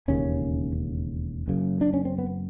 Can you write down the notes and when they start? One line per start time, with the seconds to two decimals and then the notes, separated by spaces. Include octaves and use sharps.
0.08 E1 D#2 C#3 C#4
1.48 F#1 F#2 C#3
1.81 D4
1.94 C#4
2.05 C4
2.18 B3